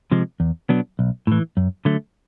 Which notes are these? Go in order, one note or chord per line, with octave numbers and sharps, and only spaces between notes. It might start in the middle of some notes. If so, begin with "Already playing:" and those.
C3 F3 G#3
E2
B2 F#3 B3 D4
B1
A2 E3
F#2
D3 F#3 A3